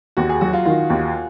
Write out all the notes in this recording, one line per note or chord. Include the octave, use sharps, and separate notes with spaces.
D#2 F#4
G#4
F#3 F#4
F4
D#3 F4
D#2